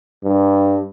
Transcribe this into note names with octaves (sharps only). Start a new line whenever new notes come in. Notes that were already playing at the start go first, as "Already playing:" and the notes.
G2